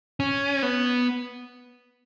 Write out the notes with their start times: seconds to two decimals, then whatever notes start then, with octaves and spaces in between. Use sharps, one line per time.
0.20 C#4
0.63 B3